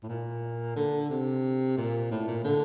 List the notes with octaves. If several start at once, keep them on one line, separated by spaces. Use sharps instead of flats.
A2
A#2
D3
C3
A#2
A2
A#2
D3